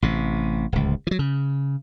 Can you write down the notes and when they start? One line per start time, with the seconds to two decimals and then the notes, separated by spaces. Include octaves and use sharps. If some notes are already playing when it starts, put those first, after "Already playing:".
0.02 A1 C3
0.72 D1 C#2
1.07 E3 F#3
1.19 C#3